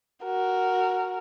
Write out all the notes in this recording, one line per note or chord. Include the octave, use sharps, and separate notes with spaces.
F#4 A#4